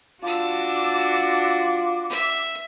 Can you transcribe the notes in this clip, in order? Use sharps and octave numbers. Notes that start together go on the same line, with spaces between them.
D4 F4 F#4 A5 D6 E6
E5